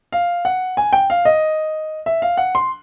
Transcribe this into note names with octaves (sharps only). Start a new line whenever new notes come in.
F5
F#5
G#5
G5
F5
D#5
E5
F5
F#5
C6